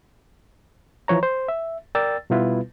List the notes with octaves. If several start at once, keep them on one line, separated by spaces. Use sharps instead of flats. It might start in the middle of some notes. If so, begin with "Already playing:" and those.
E3 F3 C#5 A#5
C5
E5
A#4 D5 G5 E6 A6
B2 G3 B3 E4 F4 B4